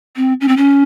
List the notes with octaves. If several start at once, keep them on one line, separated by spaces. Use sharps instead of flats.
C4
C#4
C4
C#4